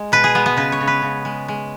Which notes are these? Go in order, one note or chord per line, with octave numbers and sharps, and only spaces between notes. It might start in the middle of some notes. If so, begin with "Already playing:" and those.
Already playing: G#3
B2 B4
G#4
G#3 B3
B3
C#3 B4
C#5
C#3
B4
C#3
G#3
G#3